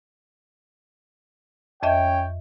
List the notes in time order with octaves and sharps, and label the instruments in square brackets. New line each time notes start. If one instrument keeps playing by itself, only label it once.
[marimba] F2 D#5 E5 [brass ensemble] C#4 C#5 G5